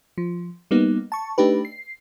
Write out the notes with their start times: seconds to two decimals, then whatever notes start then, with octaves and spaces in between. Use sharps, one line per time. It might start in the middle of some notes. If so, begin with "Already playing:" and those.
0.18 F3
0.71 G3 A#3 B3 D#4
1.12 A5 C#6
1.38 A3 D4 D#4 G4 B4
1.65 C7